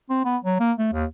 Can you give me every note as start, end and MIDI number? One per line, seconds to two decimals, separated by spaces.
0.10 0.22 60
0.25 0.37 59
0.45 0.58 54
0.60 0.73 58
0.79 0.92 57
0.93 1.05 39